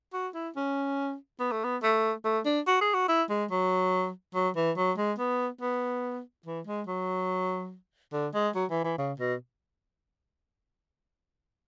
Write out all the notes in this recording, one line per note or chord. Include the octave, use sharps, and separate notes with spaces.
F#4
E4
C#4
B3
A3
B3
A3
A3
D4
F#4
G#4
F#4
E4
G#3
F#3
F#3
E3
F#3
G#3
B3
B3
E3
G#3
F#3
D3
G#3
F#3
E3
E3
C#3
B2